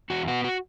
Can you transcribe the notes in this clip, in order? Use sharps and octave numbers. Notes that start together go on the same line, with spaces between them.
E2 F#4
B3 F#4
F#4